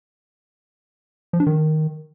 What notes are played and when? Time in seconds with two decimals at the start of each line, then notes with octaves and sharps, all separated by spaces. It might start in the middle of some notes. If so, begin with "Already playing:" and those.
1.33 F3
1.40 D4
1.47 D#3